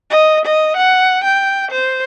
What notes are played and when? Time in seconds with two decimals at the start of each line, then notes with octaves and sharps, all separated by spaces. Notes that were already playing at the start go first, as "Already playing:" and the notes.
0.10 D#5
0.45 D#5
0.76 F#5
1.24 G5
1.71 C5